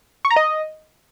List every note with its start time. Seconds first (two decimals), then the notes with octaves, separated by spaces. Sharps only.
0.25 C#6
0.31 A#5
0.36 D#5